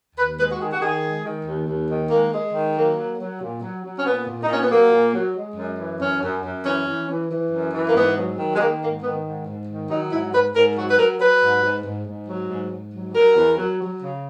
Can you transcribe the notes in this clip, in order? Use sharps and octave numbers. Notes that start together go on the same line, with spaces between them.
D#2 B4
G#3 B4
F#4
D#3 G#4
F#4
D#3 G#4
G#3
D#3
D#2
D#2
D#3
G#3 A#3
G#3
D#3
F#3 A#3
F#3
F#3
A#2
F#3
F#3
C#4
A#2 B3
A#2
D#4
A#2 C#4
B3
F#3 A#3
A#2
F#3
G#3
F#2
E3
F#2 C#4
F#2
F#2
E3 C#4
E3
E3
E3
F#2
E3
A#3
G#2 B3
F#3
D#3
G#3
D#3 A#3
G#2 A#3
D#3 B3
G#2
G#2
D#3
F#3 D#4
G#2 E4
G#2 B4
G#2 A#4
F#3 F#4
B4
F#3 A#4
F#3 B4
G#2
G#2
G#2
G#2
F#3
G#2
G#2
F#3
F#3 A#4
E2
F#3
F#3
C#3